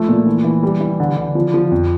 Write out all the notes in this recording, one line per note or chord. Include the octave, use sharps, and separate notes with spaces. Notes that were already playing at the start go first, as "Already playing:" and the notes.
Already playing: F3 A3
A#2
E3
E3
G3
E3
D3
D3
F3
F3
F2